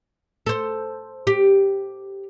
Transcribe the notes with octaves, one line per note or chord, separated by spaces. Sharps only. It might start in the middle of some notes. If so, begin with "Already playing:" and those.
A4 C5
G4